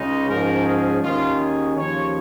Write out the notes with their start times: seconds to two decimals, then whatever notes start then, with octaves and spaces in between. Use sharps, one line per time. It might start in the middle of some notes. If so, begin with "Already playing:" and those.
Already playing: C#2 C#3 G#3 D#4 D#5
0.29 G#2 F3 C#4 A#4
0.66 G#4
1.04 D#2 D#3 C#4 F4
1.40 G#4
1.76 D#2 C#3 F3 C#5